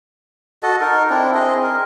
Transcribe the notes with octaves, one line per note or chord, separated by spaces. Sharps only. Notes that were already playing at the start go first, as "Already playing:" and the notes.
F#4 A4 D#5
D#4 A#4
C4 D4 E4
C4 G#4 D#5
A#4